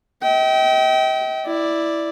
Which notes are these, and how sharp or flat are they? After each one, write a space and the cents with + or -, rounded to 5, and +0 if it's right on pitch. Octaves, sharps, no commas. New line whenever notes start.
D#5 +45 G5 -25
E4 +0 D5 +0